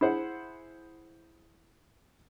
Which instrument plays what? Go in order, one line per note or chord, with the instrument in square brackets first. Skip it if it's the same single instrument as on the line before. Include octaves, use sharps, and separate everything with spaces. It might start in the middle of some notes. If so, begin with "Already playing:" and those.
[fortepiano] E4 G#4 C5 F#5